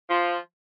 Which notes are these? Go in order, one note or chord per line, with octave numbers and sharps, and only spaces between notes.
F3 F4